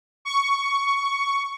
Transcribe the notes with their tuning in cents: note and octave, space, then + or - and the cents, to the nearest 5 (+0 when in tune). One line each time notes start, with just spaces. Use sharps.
C#6 +10